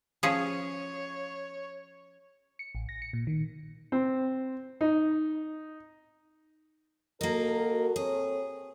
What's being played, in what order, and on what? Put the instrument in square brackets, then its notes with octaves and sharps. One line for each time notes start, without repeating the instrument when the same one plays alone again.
[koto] F3 C#4 G#4 [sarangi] C#5
[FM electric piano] C#7
A1
A#6
C#7
A#2
D#3
[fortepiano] C4
D#4
[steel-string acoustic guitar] A#3 D#4 [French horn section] F#4 A4 A#4
[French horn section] C4 A4 C#5 [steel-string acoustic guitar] G#4